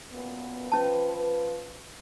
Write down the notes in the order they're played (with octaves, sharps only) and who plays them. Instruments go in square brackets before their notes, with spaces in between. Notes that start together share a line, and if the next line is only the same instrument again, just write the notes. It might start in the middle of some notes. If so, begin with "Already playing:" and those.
[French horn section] F#2 A#2 B3
[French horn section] F3 B4 [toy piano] C#4 A5